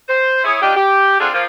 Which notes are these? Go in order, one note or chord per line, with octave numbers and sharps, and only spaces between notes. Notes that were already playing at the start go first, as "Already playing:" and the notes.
C5
E4 G#4 C#5
D4 D#4 F4 G4
G4
C4 D4 F4 F#4 G#4 A4
F3 A#3 F4